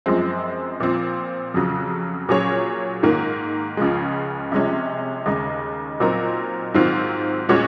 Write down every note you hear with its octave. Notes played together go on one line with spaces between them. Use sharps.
F#2 F3 G#3 C4
A#2 F3 C4
F2 C#3 F#3
A#2 F#3 C#4 G#4 C#5
G#2 D#3 A#3
C#2 C#3 F3 G#3
C3 F3 G#3 C#4
D#2 C#3 G#3 D#4
A#2 F#3 C4 D#4 A#4
G#2 D#3 F#3 C4 F4
A#2 G#3 C#4 F#4 C#5